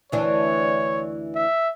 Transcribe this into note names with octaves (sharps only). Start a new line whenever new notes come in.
D2 E3 D4 C#5
E5